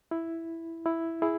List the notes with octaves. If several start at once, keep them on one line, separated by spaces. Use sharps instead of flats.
E4
E4
E4 G#4